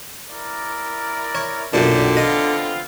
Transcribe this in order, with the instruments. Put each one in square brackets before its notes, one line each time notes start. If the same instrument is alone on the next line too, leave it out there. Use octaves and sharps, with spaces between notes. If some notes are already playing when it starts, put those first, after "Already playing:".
[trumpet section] E4 A#4 D5
[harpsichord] C#5
[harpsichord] B1 F#2 A#2 [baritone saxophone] D3 [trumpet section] G4
[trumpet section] B3 C4 F4 [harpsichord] D#5